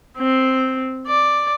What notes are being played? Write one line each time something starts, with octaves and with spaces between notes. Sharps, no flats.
C4
D5